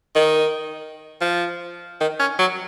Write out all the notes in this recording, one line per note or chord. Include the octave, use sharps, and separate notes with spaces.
D#3
F3
D#3
C#4
F#3